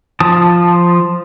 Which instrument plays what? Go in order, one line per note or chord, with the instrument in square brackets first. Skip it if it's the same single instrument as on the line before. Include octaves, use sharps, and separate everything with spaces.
[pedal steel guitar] F3 A5 D#6